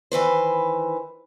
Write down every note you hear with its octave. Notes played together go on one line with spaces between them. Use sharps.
D#3 E3 B4 C5